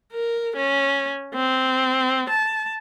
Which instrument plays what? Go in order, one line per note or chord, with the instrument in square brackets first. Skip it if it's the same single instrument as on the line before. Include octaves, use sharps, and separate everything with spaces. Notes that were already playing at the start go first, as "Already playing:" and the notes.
[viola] A#4
C#4
C4
A5